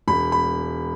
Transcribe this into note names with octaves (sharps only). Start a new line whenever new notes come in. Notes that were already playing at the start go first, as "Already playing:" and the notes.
E1 B5
B5